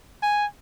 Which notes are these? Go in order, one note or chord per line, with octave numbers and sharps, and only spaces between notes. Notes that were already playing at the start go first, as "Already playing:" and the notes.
G#5